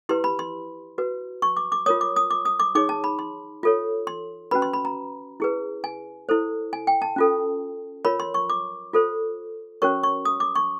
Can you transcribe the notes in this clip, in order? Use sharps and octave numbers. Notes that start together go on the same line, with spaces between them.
E4 G4 B4 C6
B5
C6
F#4 B4
C#6
D6
D6
F4 A#4 C#5 D#6
D6
D#6
D6
D#6
D6
D#4 G#4 C#5 D6
A5
B5
C6
F4 A4 C#5
C6
C#4 F#4 B4 B5
C6
B5
A#5
E4 G#4 B4
G#5
E4 A4 C5
G#5
G5
A5
C#4 F4 A4
F4 A#4 C#5 B5
C6
C#6
D6
F4 A4 C5
C#4 F#4 A#4 C#5 C#6
C#6
D#6
D6
C#6